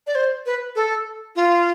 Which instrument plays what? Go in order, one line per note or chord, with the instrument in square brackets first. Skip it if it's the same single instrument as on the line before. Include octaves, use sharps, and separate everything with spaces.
[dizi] D5
C5
B4
A4
F4